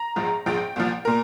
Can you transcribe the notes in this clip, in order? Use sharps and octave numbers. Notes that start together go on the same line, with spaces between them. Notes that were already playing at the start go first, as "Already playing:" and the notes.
Already playing: A#5
A#1 G#2 F3 G#3
A#1 G#2 F3 G#3 G5
C2 A#2 F3
A#2 A#4